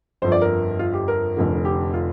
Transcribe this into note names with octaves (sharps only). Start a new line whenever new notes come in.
G1 F2 F3 C5
D5
A#4
F4
G4
A#4
F1 F2 D3
G4
F4